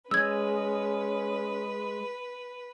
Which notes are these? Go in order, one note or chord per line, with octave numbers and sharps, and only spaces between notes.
G#3 C#4 B4 E6 G#6